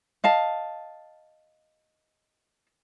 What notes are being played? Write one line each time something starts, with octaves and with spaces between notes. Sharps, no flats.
D#5 F5 A5